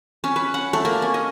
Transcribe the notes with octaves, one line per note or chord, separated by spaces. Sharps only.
C#4
B4
F#5
A3
A#3
C#4
D#5